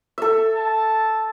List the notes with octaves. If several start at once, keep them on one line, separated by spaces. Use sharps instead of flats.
A4 E5
A5